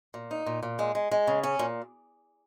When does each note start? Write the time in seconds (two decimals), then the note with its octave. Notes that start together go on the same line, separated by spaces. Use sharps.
0.14 A#2
0.31 D#4
0.46 A#2
0.63 A#2
0.79 G#3
0.95 G#3
1.11 G#3
1.27 C#3
1.43 C#4
1.59 A#2